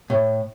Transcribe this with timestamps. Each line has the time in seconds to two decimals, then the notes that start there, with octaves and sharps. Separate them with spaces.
0.10 A2